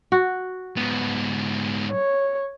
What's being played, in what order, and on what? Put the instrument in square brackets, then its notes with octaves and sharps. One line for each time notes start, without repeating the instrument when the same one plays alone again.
[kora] F#4
[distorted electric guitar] G#2 B3
[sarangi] C#5